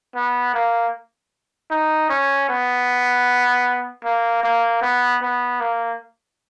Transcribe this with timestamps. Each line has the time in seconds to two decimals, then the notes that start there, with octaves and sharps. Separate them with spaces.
0.15 B3
0.54 A#3
1.71 D#4
2.10 C#4
2.49 B3
4.05 A#3
4.44 A#3
4.82 B3
5.22 B3
5.60 A#3